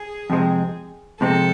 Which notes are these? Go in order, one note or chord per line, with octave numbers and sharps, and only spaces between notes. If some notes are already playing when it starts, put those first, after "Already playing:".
Already playing: G#4
F2 C3 G#3 C4
F2 C3 G#3 C4 A4